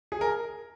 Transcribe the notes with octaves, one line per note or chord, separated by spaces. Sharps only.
G#4
A#4